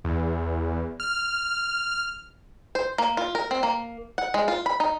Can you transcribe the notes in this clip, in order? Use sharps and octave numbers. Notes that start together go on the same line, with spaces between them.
E2
F6
C5
A#3
F4
A#4
C4
A#3
F#5
G#3
F4
B5
D#4